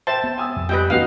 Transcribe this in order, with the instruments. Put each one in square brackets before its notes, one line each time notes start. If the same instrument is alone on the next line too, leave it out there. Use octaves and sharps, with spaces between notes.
[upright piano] C5 E5 G5 [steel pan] A5
[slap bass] B3
[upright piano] G#5 D#6 E6
[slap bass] F2
[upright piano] G3 [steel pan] B4 D#5 G5
[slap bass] D#2 A3 C#4 [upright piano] B3 D#4 F#4 [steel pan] F5